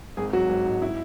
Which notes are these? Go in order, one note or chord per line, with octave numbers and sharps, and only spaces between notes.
G#1 G#4
F#3 F#4
G#1
G#2
E4